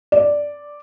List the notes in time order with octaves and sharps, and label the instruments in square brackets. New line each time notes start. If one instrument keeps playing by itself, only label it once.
[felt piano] D5